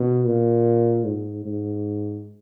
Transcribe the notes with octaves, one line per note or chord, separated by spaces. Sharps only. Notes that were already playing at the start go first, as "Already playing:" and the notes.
Already playing: B2
A#2
G#2
G#2